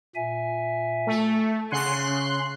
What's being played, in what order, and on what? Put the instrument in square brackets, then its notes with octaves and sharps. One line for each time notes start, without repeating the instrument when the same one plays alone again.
[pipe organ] A#2 E5 G#5
[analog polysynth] A3
[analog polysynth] C#3 C6 F#6 [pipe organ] C#5 F#5 G#5
[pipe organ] C#4